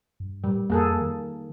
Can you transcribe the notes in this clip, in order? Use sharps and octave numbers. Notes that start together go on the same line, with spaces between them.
G2
A2 G3
F2 A#3 G#4 A4
D#3